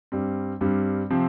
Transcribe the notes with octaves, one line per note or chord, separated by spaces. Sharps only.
G2 G3 C4
G2 G3 C4
C3 F3 C4